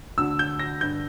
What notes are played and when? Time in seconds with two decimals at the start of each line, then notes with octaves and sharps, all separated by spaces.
0.18 D2 D3 E6
0.39 G6
0.59 A#6
0.81 G2 D3 G6